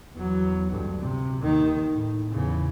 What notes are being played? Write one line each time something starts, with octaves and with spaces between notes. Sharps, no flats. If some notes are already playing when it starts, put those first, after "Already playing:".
E2 F#3
D2 G2
C3
D#2 D#3
A2
E2 C#3